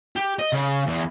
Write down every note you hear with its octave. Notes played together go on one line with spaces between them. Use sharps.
G4
D#5
C#3
E2